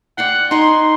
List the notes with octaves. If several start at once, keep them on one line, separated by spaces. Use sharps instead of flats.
D5 F#5 G5 C6
D#4 G#5 C6